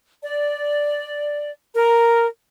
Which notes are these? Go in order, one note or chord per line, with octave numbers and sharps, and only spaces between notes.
D5
A#4